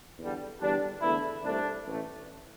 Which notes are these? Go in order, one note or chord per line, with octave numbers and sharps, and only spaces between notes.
E2 D3 G3
E2 D3 G3 D4
E2 D3 A3 E4
C2 C3 A3 D4
A1 A2 A3